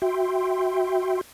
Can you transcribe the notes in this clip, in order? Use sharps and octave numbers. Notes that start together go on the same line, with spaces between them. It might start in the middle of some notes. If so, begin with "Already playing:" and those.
F#4 E5 G5 C6